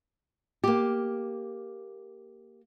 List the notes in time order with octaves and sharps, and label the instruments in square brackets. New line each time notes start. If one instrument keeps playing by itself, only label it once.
[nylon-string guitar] A#3 G4